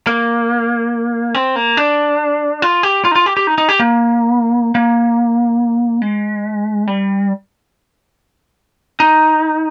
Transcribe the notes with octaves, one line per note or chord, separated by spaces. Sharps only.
A#3
C4
A#3
D4
F4
G4
F4
D#4
F4
G4
G4
D#4
D#4
G4
A#3
A#3
G#3
G3
D#4